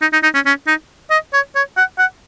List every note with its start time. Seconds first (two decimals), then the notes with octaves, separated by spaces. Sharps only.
0.02 D#4
0.13 D#4
0.23 D#4
0.34 C#4
0.46 C#4
0.67 D#4
1.11 D#5
1.33 C#5
1.55 C#5
1.77 F#5
1.99 F#5